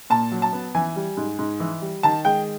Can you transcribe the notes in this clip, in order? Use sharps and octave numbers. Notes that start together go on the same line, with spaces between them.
A#2 A5
F#3
A5
B3
E3 G#5
G3
G#2
G#2
E3
G3
D#3 A5
G#3 G5